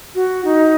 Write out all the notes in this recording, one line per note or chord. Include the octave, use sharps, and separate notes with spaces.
F#4
D#4